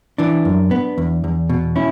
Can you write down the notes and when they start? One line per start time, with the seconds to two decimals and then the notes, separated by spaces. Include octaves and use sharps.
0.18 E3 D4
0.45 F#2
0.71 B3
0.98 E2
1.24 E2
1.49 B2
1.76 C#4 E4